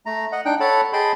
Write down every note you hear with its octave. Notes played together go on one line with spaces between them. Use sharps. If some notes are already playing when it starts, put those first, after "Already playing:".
A3 A#5
D#5 F#5
D4 D#4 G5 F#6
A4 C#5 F#5 A5 B5
G#4 D#5 G5 A5 B5 C6